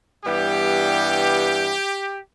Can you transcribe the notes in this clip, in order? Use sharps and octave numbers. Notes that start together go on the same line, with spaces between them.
G2 E3 G3 B3 G4